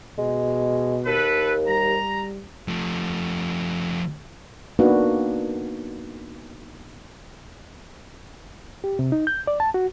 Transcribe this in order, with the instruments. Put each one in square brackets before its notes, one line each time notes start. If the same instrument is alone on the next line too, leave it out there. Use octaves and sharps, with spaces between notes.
[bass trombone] B2 [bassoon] G#3
[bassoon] D#2 [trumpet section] A4 B4
[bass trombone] G3 [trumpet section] A#5
[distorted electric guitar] F3 A3
[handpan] A#3 B3 D4 D#4 F#4 B4
[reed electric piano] G4
C3
D#4
G6
D5
A5
F#4